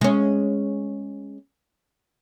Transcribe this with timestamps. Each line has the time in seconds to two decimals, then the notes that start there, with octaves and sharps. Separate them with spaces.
0.01 G#3 C#4